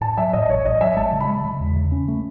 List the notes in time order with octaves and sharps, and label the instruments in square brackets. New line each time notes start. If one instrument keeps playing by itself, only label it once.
[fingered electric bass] A2 [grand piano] A5
[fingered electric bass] F#3 [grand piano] E5
[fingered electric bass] A2 [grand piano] D#5
[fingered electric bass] A1 [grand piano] C#5
[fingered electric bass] A1 [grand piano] D#5
[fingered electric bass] F#3 [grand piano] E5
[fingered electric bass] G#3 [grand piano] A5
[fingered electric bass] C#3
[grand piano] B5
[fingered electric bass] G#3
C#3
E2
C#3
C#4
A3